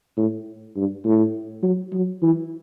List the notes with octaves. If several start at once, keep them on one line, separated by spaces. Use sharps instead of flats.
A2
G2
A2
F#3
F#3
E3